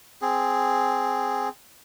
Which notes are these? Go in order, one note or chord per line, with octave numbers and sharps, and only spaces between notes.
C4 G#4